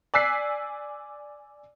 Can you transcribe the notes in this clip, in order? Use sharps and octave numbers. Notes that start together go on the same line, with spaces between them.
D5 G#5 E6 F#6 B6 C7